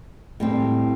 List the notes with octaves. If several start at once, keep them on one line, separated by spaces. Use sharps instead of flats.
A2 G3 C4